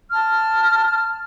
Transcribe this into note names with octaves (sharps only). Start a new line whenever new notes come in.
A5 F6